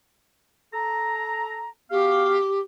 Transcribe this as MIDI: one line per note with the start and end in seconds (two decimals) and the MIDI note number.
0.72 1.69 69
0.72 1.69 81
0.72 1.69 82
1.91 2.37 59
1.91 2.37 66
1.91 2.59 67
1.91 2.37 77